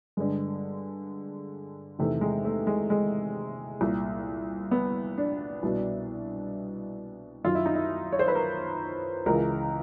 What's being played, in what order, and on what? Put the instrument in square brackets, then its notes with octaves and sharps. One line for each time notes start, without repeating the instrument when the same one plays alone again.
[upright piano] G2 D3 G#3
E2 C3 D#3 A3
G#3
A3
G#3
G#3
C2 A#2
B3
D4
C2 B2
F#2 D#3 F4
E4
D#4
E4
C#5
C5
B4
A#4
C#2 C#3 E3 A#4